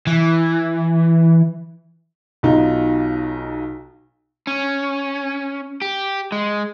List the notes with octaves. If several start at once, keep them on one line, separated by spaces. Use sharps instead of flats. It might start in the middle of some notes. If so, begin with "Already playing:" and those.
E3
B1 B2 D#4 F4
C#4
G4
G#3